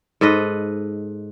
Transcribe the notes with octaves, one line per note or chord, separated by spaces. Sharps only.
G#2 A4 B4 D#5